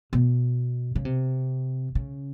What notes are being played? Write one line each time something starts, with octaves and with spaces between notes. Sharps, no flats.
B2
C#3
C3
C#3